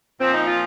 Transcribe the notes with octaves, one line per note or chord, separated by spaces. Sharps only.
A#2 F3 C4
D#4
F4